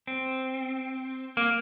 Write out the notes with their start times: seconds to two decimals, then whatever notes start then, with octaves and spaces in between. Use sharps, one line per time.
0.07 C4
1.37 A#3